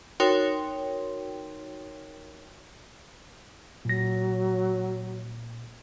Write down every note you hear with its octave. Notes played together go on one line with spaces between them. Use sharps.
D#4 F#4 A#4 C#5 G5 C6
A#2 F#3 A#6